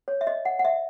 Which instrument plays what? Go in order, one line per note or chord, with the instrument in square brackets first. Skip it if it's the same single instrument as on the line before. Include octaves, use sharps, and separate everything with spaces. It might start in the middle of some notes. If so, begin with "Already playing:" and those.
[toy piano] C#5
E5
D#5
F#5
F#5
E5